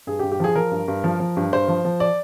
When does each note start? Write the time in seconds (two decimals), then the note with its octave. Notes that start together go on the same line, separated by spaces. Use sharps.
0.07 G2 G#4
0.19 G4
0.23 G2
0.32 G4
0.40 F3 G#4
0.55 F3 A#4
0.71 G2
0.88 G2
1.04 F3
1.20 F3
1.37 G2
1.52 G2 C5
1.68 F3
1.85 F3
2.00 D5